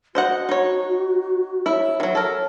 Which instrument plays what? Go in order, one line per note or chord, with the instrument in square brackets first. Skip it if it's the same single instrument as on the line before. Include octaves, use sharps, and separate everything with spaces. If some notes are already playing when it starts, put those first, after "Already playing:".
[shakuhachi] F#4 [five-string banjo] C5 D#5 F#5
[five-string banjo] D#4 C#5
[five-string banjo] E4 E5 [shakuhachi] C#5
[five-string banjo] D#3 F#3 [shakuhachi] E5
[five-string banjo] A4 A#4 [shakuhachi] C#5